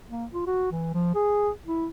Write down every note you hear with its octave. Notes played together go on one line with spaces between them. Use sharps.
A#3
F4
F#4
E3
F3
G#4
E4